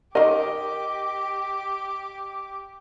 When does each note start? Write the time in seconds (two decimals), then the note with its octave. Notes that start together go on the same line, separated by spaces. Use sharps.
0.15 D#3 G4 A#4 D#5 D6